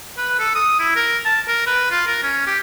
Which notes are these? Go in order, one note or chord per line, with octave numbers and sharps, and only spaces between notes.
B4
A4
D#6
E4
A#4
A5
A#4
B4
F4
A#4
C#4
G4